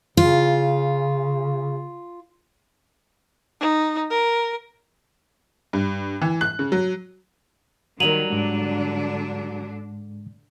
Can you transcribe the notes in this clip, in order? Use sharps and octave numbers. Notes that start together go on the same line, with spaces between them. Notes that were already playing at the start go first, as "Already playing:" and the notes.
C#3 F4
D#4
A#4
G2
E3
F#6
C#3
F#3
D#3 F#3 G3 A#4 D#7 F7 F#7
G#2 D3 G#3 D4